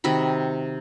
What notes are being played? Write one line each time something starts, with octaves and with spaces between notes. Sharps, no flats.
C3 D#3 F#4 B5